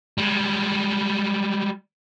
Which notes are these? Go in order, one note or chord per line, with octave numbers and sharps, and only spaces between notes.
G3 G#3